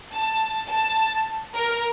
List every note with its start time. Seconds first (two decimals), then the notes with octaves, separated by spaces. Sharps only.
0.11 A5
0.68 A5
1.55 A#4